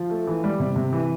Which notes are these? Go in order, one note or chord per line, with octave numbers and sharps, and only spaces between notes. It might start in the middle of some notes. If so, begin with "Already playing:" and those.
Already playing: F3
A3
E3
G3
C3
C3
E3